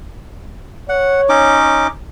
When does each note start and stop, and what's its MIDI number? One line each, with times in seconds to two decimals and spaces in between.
0.89 1.65 73
0.89 1.21 78
1.29 1.87 61
1.29 1.87 63
1.29 1.87 86